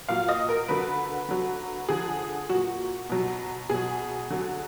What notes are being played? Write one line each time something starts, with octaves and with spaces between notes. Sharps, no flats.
A#2 F#3 F5
D#5
A#4
D3 F#3 B4
D3 F#3
D3 F3 G#4
A#2 F#3 F#4
B2 F#3
B2 F#3 G#4
D3 F#3